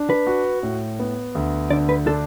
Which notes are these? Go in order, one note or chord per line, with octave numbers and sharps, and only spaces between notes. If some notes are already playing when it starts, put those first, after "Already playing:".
Already playing: D4
B4
F#4
A2
B3
D2
D3 D5
B4
D4 A4